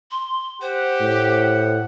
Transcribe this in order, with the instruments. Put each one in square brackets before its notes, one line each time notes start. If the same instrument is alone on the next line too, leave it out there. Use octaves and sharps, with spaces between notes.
[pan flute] C6
[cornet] G4 [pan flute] C5 [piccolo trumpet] F#5
[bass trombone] A2